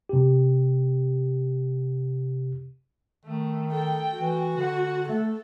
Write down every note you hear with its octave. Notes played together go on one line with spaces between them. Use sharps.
C3 G4
D#3 A3
A4 G5
E3 F#4
D3 F#5
A3 A4